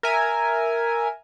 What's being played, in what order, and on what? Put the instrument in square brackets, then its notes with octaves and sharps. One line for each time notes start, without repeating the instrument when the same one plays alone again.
[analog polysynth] A#4 E5 G#5